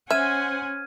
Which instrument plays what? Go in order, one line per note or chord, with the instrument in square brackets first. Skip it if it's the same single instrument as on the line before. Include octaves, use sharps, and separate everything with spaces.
[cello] C#4 [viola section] C5 F#5 G#5 [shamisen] E5 [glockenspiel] F6 G#6 D#7